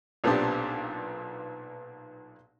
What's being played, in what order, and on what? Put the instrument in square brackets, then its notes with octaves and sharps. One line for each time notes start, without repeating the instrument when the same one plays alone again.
[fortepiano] B1 A#2 B3 C4 D4 G4